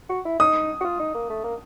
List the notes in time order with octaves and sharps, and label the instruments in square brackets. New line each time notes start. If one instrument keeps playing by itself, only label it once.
[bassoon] F#4
E4
[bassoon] D#4 [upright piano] D#6
[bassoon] F#4
F4
D#4
A#3
A3
A#3